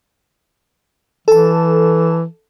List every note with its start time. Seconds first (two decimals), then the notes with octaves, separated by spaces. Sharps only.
1.28 E3 A4 A5